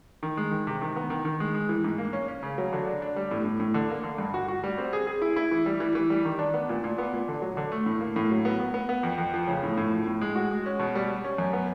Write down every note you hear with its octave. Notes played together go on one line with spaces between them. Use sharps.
D#3
G#3
D#3
C3
D#3
B3
D#3
D#3
G#3
G#3
E3
G#2
A#3
C#4
C#4
C#3
F#3
D3
D4
D4
G3
A2
A2
A2
D3
A#3
D3
G2
F#4
F#4
G3
C4
G#4
G#4
E4
E4
E3
G3
E3
E3
G3
D#3
D4
B3
A#2
A#2
B3
A#2
D3
F#3
D3
A3
A2
A#3
A2
F#3
B3
B3
B3
B3
F2
F2
F3
C#3
A2
A2
F3
A2
G#3
F#4
G#3
C#4
B2
G3
G3
C#4
F#2
B3